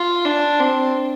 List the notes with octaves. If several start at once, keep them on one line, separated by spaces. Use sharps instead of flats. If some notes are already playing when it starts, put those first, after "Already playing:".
Already playing: F4
D4
C4